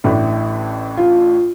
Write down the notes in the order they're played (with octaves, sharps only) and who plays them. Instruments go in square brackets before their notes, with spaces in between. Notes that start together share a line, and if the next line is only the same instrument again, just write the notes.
[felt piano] A1 A2 E3 A3 D4 [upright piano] E4
[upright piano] F4